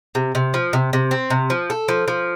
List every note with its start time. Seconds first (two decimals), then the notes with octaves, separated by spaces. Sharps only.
0.15 C3
0.35 C3
0.54 F3
0.73 C3
0.93 C3
1.11 C4
1.30 C3
1.50 F3
1.70 A4
1.88 F3
2.08 F3